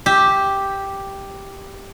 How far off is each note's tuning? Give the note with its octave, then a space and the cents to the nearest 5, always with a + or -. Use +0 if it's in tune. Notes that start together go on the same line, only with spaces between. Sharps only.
G4 +0 E5 -20